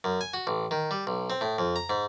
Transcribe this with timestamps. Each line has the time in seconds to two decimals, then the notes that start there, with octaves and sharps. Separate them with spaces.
0.04 F#2
0.21 G#5
0.34 F#4
0.47 A1
0.71 D#3
0.91 G3
1.07 B1
1.30 C4
1.41 A2
1.58 F2
1.76 A#5
1.90 G#2